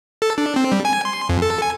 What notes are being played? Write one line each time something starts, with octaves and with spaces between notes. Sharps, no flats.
A4
D4
C4
G3
G#5
C6
F2
A4
G#5